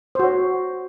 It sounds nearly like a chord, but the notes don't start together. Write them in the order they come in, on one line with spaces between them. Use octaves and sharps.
C5 F#4 C#5